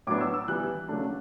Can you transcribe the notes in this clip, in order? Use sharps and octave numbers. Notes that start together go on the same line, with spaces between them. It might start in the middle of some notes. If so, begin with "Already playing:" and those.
A2 F#3 B3 D4 D6
E6
E6
E3 G3 B3 F#6
C#3 F#3 A3 D4